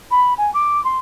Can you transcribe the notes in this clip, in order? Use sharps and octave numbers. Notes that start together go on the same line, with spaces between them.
B5
G#5
D6
C6